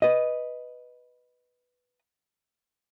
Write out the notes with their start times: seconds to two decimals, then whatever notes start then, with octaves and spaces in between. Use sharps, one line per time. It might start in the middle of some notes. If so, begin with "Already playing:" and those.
0.02 B4 D#5